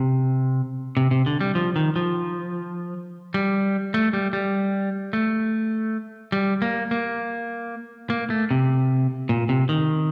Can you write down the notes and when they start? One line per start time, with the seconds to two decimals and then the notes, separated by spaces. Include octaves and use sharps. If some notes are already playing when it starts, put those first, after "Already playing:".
Already playing: C3
0.97 C3
1.11 C3
1.26 D3
1.41 G3
1.55 F3
1.76 D#3
1.96 F3
3.34 G3
3.94 A3
4.13 G3
4.33 G3
5.13 A3
6.32 G3
6.62 A#3
6.91 A#3
8.10 A#3
8.30 A3
8.51 C3
9.29 A#2
9.49 C3
9.69 D#3